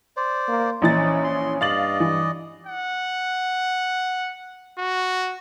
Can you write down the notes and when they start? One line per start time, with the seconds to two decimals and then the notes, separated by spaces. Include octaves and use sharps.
0.17 C5 D5
0.48 A#3
0.82 A#1 E3 C#4 D#4 A6
1.24 C6
1.61 G2 D5 D#5 F5 A6 F#7
2.00 E3
2.67 F#5
4.79 F#4